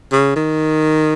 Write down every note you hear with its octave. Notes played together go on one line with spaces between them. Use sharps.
C#3
D#3